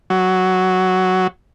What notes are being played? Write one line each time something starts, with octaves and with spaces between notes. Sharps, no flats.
F#3